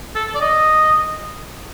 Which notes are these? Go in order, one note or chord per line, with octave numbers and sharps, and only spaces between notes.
A4
D5
D#5